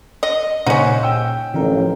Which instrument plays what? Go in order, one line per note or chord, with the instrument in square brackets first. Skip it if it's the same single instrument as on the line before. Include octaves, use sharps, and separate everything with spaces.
[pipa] D#5
[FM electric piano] A#2 [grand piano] C#3 C5 F#5 [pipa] C#4 D#4
[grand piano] G5 E6
[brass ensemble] A1 F2 [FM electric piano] D3 A#4